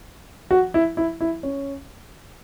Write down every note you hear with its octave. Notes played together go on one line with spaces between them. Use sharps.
F#4
E4
E4
E4
C#4